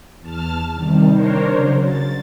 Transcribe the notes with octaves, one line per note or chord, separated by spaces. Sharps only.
E2 A5 F6 A6
C3 D#3 G3
D4 A#4 C5 C#5
C#3 F#3
A6